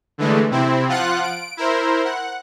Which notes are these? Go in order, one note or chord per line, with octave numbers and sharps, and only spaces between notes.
D3 E3 G#3 A3
C3 C4 E4
F3 F4 F#5 F#6
D7
E4 A#4 C5
F#5